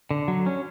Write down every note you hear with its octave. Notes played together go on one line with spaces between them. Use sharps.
D3
F#3
C#4